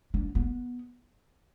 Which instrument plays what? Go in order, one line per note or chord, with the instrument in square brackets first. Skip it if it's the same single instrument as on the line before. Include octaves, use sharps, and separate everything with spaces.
[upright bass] D4
B3